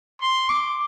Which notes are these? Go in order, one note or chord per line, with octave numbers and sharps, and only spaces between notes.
C6
D6